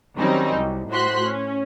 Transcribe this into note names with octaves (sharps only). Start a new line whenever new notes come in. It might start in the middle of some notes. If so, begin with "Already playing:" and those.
D#3 F#3 G3 C4 C#4 D#4
C2
A2 F#4 C5 C6 F#6 B6
C#4